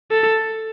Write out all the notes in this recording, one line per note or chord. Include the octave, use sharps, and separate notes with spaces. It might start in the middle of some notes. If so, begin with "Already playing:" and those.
A4